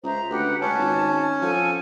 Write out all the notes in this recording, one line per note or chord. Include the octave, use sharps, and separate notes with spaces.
C#2 C5 E5 A#5
D2 G4 B4 F#5
C#2 C#4 A5
G#1
F3 A4 F#5 G#5